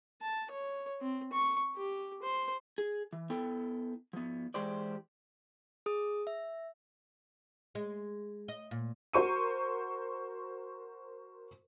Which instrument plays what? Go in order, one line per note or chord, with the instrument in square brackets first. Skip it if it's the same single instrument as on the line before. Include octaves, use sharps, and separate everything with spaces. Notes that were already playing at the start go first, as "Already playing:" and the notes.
[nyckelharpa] A5
C#5
C4
C#6
G4
C5
[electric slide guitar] G#4
E3
B3 E4 A4 G5
F3 B3
E3 G#3 G4 C5 D5
[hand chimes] G#4 D#6
E5
[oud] G#3
D#5
A#2
[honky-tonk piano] F#4 A#4 C5 C#6 D#7